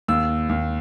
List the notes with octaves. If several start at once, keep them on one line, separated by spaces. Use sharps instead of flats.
D#2 E6
D#2